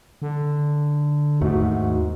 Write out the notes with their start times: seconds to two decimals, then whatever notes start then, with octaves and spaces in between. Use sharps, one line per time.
0.22 D3
1.41 D#2 G#2 D#3 A3 F#4